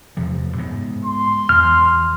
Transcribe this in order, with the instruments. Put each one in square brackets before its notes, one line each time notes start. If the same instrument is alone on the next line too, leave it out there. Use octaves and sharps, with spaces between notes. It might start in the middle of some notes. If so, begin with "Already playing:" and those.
[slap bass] E2 C3 F3
G#2 G#3 B3
[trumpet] C6
[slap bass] E2 E3 [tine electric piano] F6